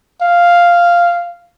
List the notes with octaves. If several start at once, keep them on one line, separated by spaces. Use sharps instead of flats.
F5